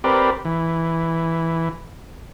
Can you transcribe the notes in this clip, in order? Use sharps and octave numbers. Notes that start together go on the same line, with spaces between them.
C4 G4 A#4 B4 D5
E3